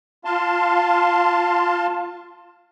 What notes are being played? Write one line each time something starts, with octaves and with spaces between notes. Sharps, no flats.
F4 F5 A5 C6